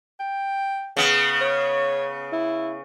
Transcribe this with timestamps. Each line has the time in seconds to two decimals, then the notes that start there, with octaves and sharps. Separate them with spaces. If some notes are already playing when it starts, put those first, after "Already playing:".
0.20 G5
0.97 C#3 B3
1.41 C#5
2.33 E4